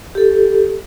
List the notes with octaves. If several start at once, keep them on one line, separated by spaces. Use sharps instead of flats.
G4 A4